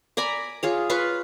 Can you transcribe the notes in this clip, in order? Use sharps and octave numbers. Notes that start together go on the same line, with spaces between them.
D5 G#5 A#5 B5
F4 G#4 C#5
F4 B4 F5 C#6